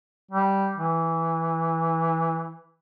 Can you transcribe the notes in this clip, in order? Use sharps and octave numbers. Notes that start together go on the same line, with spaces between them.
G3
E3